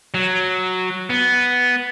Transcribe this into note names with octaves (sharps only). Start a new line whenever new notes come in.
F#3
B3